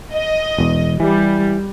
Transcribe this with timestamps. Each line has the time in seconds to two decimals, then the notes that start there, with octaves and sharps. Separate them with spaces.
0.14 D#5
0.58 E1 E2
1.00 E3 G3